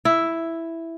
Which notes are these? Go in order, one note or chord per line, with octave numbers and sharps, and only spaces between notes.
E4